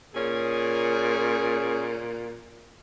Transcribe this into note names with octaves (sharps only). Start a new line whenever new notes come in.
A#2 C#4 G#4